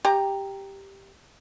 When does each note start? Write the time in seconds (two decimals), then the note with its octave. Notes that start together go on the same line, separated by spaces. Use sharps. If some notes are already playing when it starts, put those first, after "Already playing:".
0.05 G4 A#5